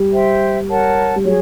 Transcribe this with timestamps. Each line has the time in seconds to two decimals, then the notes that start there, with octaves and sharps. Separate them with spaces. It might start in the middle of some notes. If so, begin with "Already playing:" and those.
Already playing: G3
0.13 C5 E5 G5
0.69 A#4 C#5 F#5 A5
1.16 G3
1.25 F#3 G#4 C#5